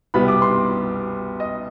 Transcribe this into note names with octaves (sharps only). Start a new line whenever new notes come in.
C2 B2 G3 B3 B5
D6
C6
D#5